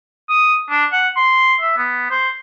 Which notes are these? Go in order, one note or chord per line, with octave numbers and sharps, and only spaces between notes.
D#6
D4
F#5
C6
E5
B3
C5